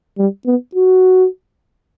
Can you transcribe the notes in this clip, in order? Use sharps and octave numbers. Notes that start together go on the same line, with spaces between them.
G3
B3
F#4